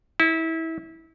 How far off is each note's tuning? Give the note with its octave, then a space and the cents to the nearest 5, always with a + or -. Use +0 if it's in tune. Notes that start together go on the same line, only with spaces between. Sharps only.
E4 -25